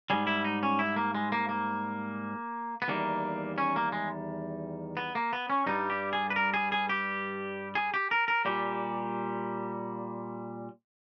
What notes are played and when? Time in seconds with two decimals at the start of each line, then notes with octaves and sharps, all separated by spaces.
0.10 G#2 G3 G#4
0.27 E4
0.44 D#4
0.63 C#4
0.79 E4
0.96 A#3
1.15 G#3
1.32 A#3
1.49 A#3
2.82 B3
2.88 E2 D#3 G3 A#3
3.58 C#4
3.76 A#3
3.92 G#3
4.97 B3
5.15 A#3
5.33 B3
5.50 C#4
5.66 G2 G3 D#4
5.90 G4
6.13 G#4
6.30 B4
6.36 A#4
6.54 G#4
6.72 G#4
6.89 G4
7.75 G#4
7.94 G4
8.11 A#4
8.28 A#4
8.45 A#2 G3 G4